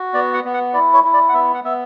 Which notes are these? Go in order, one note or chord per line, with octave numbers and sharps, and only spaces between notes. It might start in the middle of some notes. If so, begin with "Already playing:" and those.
Already playing: F#4
B3 D5
F#5
B3
F#5
E4 D5
C#5
E4
D5
F#5
B3 E5
F#5
B3 E5